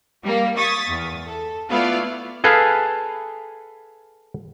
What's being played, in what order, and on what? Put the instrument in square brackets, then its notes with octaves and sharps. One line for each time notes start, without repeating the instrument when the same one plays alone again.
[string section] G3 A#3
C#6 D#6 G#6 A6 B6
E2
A4
A3 B3 E4 F4 D5 F5
[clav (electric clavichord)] G#4 A4 B4 F5 G#5